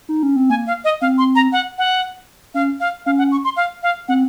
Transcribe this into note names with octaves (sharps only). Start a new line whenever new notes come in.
D#4
C#4
C4
A#3 G#5
F5
D#5
C4 F5
C6
A#5
F#5
F#5
C#4 F5
F5
C#4 F5
F#5
C#6
C6
F5
F5
C4 F#5